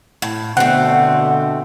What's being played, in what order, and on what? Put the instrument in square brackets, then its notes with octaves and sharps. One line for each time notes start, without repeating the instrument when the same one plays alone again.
[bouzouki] A2
[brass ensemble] B2 D3 [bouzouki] A3 C4 [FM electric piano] F#5